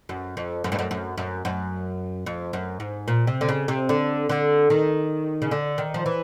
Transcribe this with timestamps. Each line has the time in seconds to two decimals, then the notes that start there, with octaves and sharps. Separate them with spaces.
0.09 F#2
0.37 F2
0.64 F#2
0.72 G2
0.79 F#2
0.91 F#2
1.18 F#2
1.45 F#2
2.26 F2
2.53 F#2
2.80 G#2
3.08 A#2
3.27 C3
3.41 D3
3.49 C#3
3.68 C3
3.89 D3
4.29 D3
4.70 D#3
5.42 C#3
5.51 D3
5.78 D#3
5.94 F3
6.06 E3